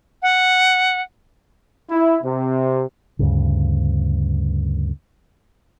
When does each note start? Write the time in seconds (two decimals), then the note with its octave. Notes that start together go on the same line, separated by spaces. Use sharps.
0.22 F#5
1.90 E4
2.23 C3
3.19 D2 G2 C#3